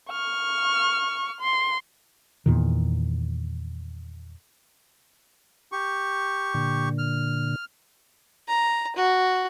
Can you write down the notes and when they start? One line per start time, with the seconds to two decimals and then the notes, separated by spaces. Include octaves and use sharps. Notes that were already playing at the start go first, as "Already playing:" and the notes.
0.11 C#6 F6
1.40 C6
2.46 E2 A#2 D#3
5.72 G4 C#6
6.54 A#2 D3
6.98 F6
8.48 A#5
8.96 F#4